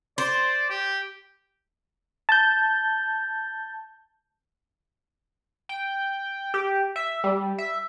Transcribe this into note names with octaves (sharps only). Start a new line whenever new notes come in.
C5 D5
G4
A5 G6
G5
G4
E5
G3
E5